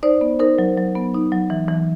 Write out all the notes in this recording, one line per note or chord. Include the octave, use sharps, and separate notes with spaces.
D#4 C5 D5
B3
D#4 A#4 C5
F#3
F#3
B3
D#4
F#3
E3
E3